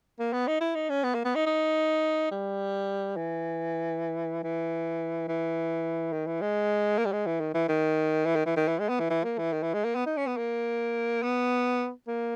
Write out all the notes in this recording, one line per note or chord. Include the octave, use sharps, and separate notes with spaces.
A#3
B3
D#4
E4
D#4
C#4
B3
A#3
B3
D#4
D#4
G3
E3
E3
E3
D#3
E3
G#3
A#3
G3
G#3
E3
D#3
E3
D#3
E3
D#3
E3
D#3
E3
G#3
B3
E3
E3
A#3
E3
D#3
E3
G#3
A#3
B3
D#4
C#4
B3
A#3
B3
A#3